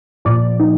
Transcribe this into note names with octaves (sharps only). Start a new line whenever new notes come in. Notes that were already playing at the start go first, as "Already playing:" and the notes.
A#2 F3 D5
D#4